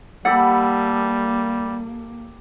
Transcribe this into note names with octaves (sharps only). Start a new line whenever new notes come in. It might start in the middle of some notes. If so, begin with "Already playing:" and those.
G3 A#3 G4 A4 F#5 B5